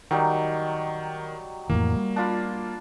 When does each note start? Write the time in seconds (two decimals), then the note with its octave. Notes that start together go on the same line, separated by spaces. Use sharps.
0.11 D#3 F#3 G3 D#4
1.70 F2 A2 E3 A#3
1.96 G3
2.16 D4 F4 B5